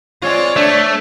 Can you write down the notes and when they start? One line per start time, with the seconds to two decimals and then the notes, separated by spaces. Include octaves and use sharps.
0.22 G#3 C4 F4 C#5 D5
0.56 A3 D4